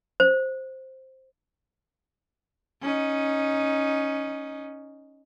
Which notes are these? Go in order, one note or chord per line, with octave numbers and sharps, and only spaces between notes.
C5
C#4 D#4